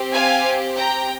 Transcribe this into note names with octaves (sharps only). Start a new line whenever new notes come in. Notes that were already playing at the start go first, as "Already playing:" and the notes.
Already playing: C4 G4
F5 G#5
G5 A#5